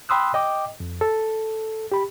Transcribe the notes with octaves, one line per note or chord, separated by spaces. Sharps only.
G5 B5 C6 D#6 E6 F#6
D#5 G5 D6
F2
A4
G4 B5